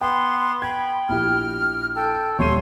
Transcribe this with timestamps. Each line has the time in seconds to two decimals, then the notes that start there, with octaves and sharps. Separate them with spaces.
0.01 B3 G5 C6
0.62 G5 B5 G#6
1.09 A#1 E4 G4 F6
1.96 A4 G5
2.39 D#1 G3 C#5 C6 D#7